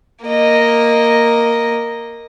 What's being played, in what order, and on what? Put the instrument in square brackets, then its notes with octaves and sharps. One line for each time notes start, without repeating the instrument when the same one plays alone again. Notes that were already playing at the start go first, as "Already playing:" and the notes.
[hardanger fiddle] A#3 D#5